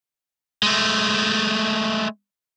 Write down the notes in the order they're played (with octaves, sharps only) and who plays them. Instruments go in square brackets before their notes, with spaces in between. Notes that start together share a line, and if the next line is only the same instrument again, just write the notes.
[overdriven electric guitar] G#3 A3